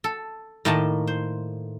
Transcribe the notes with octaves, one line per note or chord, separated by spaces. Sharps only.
A4
A2 D#3 A3 A#3 D#5 A5
C5